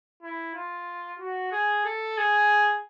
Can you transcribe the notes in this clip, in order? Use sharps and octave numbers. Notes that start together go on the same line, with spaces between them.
E4
F4
F#4
G#4
A4
G#4